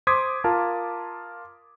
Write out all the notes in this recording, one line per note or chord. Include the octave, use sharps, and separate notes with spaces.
C5 C6 D6 D#6 G#6 B6
F4 A#4 A5